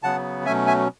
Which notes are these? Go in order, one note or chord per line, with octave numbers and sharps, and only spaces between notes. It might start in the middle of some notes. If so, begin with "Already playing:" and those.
C#3 F#3 B3 F#5 A5
B2 F#3 A3 C#4 E5 G#5
E5 G#5